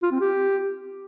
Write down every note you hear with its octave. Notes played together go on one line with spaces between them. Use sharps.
F4
C4
G4